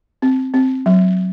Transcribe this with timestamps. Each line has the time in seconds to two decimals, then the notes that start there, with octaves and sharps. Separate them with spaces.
0.22 C4
0.54 C4
0.86 F#3